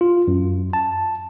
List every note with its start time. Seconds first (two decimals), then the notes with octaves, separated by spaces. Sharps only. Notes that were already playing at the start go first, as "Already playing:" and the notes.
0.01 F4
0.28 F#2
0.73 A5